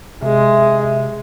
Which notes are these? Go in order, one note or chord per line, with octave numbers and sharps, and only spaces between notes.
C3 G#3 E5